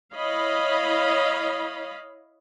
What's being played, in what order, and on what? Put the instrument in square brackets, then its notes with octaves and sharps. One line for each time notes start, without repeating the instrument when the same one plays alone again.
[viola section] E4 C#5 D#5 F5 B5